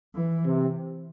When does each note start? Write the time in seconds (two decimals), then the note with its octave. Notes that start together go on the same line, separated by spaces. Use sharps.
0.15 E3
0.45 C3